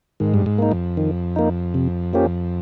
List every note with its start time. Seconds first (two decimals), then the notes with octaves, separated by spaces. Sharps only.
0.20 G#2 D#3
0.34 G2
0.46 G#2
0.59 A#3 D#4
0.72 F2
0.97 D#3
1.36 A#3 D#4
1.74 C3
2.13 F3 A#3 C#4 G4